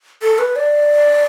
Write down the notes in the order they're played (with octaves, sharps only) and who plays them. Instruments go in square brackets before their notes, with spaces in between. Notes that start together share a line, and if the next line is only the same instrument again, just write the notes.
[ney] A4
B4
D5